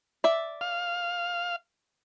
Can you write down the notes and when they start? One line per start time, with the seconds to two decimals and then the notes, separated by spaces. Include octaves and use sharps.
0.24 D5 E5
0.61 F5